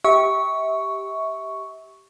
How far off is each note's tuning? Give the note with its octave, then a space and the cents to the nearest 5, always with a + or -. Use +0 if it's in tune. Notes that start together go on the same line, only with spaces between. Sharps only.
G4 +0 E5 -30 C#6 +5